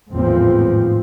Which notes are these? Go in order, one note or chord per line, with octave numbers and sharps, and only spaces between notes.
G#1 E2 A2 F3 C4